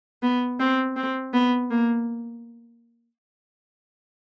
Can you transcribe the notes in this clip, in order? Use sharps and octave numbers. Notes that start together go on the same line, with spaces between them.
B3
C4
C4
B3
A#3